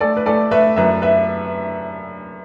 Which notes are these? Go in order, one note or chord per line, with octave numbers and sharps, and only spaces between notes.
A3 A4 D5
B4
A3 A4 D5
A3 B4 E5
F#2 B4 E5
B4 E5